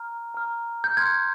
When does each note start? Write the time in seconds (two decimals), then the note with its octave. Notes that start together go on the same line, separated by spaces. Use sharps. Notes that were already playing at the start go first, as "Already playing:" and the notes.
Already playing: A#5 F6
0.34 A#5 F6
0.84 G6
0.97 C6 F6 G#6